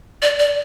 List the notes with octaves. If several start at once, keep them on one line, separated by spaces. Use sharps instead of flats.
D5
D5